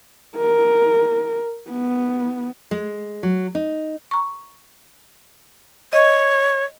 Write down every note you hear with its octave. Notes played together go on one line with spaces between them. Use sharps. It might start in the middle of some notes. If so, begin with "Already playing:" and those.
A#4
B3
G#3
F#3
D#4
A#5 C#6
C#5 D#5